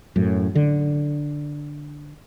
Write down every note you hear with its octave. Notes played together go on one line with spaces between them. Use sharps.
F#2 A2
D3